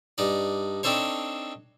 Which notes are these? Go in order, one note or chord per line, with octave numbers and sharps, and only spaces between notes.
G2 D#4 D5
C4 D4 D#4 A4 C5 C#5